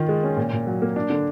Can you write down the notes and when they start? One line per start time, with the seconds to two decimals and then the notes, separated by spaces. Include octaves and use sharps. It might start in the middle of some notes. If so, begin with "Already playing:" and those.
Already playing: D#3 F4
0.09 G#3
0.23 C#4
0.37 A#2
0.53 A#2
0.67 F#3
0.82 A#3
0.96 D4
1.10 D3